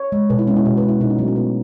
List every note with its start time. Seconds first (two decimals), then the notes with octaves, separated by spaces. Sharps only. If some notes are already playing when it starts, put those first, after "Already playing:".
Already playing: C#5
0.12 G#3
0.30 B2 B4
0.39 E4
0.47 G#3 C#4
0.56 E4
0.65 B2 F#4
0.77 B4
0.83 G#3
0.89 E4
1.01 B2 D#4
1.10 C#4
1.18 F#3 A3 D#4
1.28 C#4
1.36 B2 B3